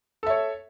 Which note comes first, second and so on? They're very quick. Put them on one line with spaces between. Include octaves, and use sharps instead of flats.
A4 E5 C#5